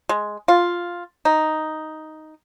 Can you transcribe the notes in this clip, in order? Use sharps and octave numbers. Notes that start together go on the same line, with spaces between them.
G#3
F4
D#4